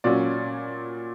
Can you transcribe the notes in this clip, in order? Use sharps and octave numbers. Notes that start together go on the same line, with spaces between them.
A#2 F#3 C#4 D5